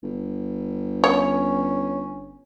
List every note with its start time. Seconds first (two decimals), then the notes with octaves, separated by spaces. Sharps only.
0.03 G1
1.04 C#4 C#5